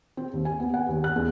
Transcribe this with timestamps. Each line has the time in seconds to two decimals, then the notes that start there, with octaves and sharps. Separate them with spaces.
0.17 C4
0.33 D#2
0.45 G#5
0.60 B3
0.74 F#5
0.89 D#2
1.04 F#6
1.16 E2